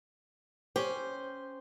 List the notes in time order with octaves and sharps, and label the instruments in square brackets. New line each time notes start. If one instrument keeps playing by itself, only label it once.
[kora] C#4 G4 [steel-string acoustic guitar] C5